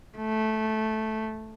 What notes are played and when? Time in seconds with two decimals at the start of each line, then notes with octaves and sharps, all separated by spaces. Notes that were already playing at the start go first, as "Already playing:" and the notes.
0.17 A3